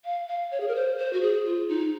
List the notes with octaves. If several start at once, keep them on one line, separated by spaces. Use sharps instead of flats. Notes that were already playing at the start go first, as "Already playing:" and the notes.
F5
F5
C#5
G#4
A#4
C5
C5
F#4
G#4
F4
D#4